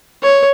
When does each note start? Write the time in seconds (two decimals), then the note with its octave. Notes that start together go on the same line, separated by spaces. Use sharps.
0.23 C#5